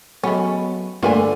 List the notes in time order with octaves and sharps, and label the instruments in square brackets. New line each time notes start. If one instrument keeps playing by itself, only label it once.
[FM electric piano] F#3 [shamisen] G#3 A3 C#4 [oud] B3
[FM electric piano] G2 A3 A#3 [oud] D3 [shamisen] F4 B4 G#5